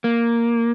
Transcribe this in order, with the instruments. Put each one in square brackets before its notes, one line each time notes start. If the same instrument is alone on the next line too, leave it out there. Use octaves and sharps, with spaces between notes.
[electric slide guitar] A#3